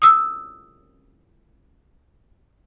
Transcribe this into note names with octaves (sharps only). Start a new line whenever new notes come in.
D#6 E6